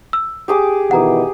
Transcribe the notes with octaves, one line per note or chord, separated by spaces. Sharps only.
E6
G4 G#4 D6
B2 D#3 E3 F#5 A#5 D#6